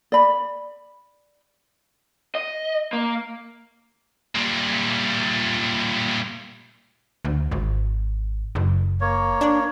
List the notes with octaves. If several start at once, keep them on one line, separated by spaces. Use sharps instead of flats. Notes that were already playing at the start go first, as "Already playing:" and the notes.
D5 B5
D#5
A#3
A#2 G3
D2
G#1
F#1
A#3 C#5
D4